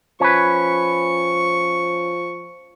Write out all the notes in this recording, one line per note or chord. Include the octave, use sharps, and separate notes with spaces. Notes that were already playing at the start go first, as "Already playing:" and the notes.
F3 C#4 B4 C#6